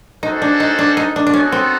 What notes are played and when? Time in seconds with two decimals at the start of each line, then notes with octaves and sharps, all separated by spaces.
0.23 A3 C#4 D#4 F#4 A4 C5
0.42 D4
0.60 D#4
0.79 D4
0.97 D#4
1.16 D4
1.27 D4
1.33 B3 C#4 D#4 F#4 A4
1.52 C4